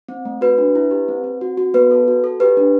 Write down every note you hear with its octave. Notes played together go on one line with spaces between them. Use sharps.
C4
A3
F#4 B4
D4
E4
G4
C4
C4
F#4
F#4
B3 B4
A4
F#4
A4
G4 B4
D4